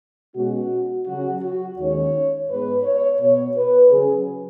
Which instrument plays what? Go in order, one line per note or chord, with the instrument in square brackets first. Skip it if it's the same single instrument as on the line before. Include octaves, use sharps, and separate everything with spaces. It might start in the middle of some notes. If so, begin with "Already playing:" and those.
[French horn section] B2 G#3 C#4 F#4
C#3 F#3 C#4 F#4
F#4
D#2 D#3 G#3 C#4 C#5
G#2 G#3 B3 B4
C#5
B2 B3 C#5
B4
C#3 F#3 C#4 G#4